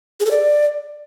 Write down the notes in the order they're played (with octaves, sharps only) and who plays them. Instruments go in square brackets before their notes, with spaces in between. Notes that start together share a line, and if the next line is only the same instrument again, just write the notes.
[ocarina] G#4
A4
D5